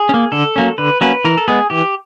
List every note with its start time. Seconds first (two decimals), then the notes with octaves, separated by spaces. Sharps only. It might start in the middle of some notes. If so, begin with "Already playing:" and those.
Already playing: G#4
0.09 C#4
0.14 A#3
0.32 D3 A4
0.56 F#3 A#3 C#4
0.78 D3 B4
1.01 F#3 A#3 C#4 B4
1.25 E3 A#4
1.37 A4
1.48 G#3 B3 G#4
1.70 E3 G4